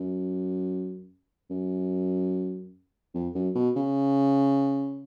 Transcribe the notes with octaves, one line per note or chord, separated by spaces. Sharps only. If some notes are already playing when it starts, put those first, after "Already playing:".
Already playing: F#2
F#2
F2
F#2
B2
C#3